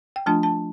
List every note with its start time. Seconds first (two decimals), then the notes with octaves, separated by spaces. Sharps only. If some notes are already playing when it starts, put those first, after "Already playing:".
0.16 G5
0.26 F3 A3 D4 F4 A5
0.43 A5